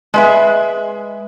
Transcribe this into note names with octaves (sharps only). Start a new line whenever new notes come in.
G#3 B4 E5